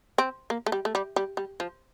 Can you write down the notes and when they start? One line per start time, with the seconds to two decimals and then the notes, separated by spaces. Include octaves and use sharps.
0.18 C4
0.50 A#3
0.66 A3
0.72 G3
0.85 A3
0.95 G3
1.16 G3
1.37 G3
1.60 F3